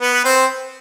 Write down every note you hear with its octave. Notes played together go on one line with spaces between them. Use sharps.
B3 B4
B4
C4 C5